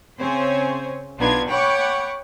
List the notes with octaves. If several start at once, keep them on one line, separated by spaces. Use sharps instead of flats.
C#3 C4 C5 C#5 G#5
B1 B3 D4 D#4 F4 G#6
C#5 F#5 G5 B5 C#6 D6